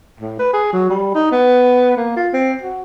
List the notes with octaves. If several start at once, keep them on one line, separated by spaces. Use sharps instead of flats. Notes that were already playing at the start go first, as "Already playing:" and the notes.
A2
B4
G#4
F#3
G3
D#4
B3
A#3
F4
C4
F#4